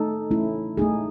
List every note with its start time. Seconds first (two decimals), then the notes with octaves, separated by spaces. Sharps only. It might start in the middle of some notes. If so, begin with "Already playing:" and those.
Already playing: A3 D#4 A4
0.31 A3 C#4 E4
0.77 A3 D#4 G#4